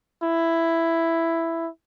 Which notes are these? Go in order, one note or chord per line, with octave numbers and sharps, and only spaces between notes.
E4